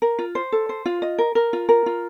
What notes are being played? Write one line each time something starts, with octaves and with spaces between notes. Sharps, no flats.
A#4
F4
C5
A4
C5
F4
D#5
A#4
A#4
F4
A#4
F4